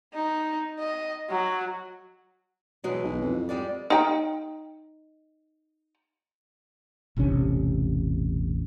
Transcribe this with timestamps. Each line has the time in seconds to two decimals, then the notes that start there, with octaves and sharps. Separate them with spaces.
0.14 D#4
0.79 D#5
1.30 F#3
2.84 B2 E3 F#3 G#3
3.03 B1
3.21 F2
3.49 G3 G#3 D5
3.90 D#4 G5
7.17 E1 A1 C3 C#4